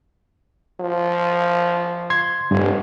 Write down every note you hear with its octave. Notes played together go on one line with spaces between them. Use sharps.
F3
C6 G#6
F1 G2